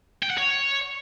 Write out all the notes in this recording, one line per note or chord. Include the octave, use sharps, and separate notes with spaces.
G5
F#5
C#5